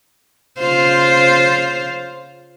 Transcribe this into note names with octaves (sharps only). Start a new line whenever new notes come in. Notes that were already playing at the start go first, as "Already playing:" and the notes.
C#3 F4 C5